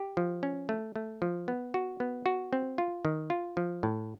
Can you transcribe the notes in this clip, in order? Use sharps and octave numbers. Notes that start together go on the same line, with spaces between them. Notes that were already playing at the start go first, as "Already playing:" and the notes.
Already playing: G4
F3
C#4
A3
A3
F3
B3
F#4
B3
F#4
C4
F4
D#3
F4
F3
A2